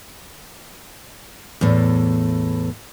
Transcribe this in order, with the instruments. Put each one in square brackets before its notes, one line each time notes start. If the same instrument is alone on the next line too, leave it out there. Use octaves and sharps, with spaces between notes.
[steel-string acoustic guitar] E2 A2